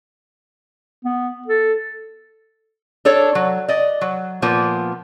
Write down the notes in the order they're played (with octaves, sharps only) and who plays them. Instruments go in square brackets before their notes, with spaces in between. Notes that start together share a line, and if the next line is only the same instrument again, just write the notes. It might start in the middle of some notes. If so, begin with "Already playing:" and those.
[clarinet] B3
A4
[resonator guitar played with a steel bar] D4 A4 C#5
F#3
D5 D#5
F#3
A#2 F3 A#3 B3